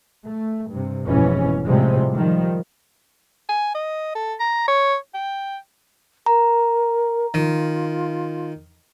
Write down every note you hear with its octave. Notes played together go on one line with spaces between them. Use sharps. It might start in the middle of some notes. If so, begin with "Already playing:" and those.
A3
G2 C3
F1 G#2 B2 E3 C#4
A2 C3 F3 G3 G#3
D#3 F3 G3
G#5
D#5
A4
A#5
C#5
G5
A#4 A#5
D#3 F4